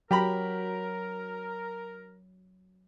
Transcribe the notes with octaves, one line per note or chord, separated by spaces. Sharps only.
F#3 G4 A#4 A#5 B5